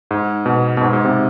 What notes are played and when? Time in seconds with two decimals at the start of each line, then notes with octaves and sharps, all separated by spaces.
0.11 G#2
0.46 B2
0.77 B2
0.81 G#2
0.93 G#2
1.05 C3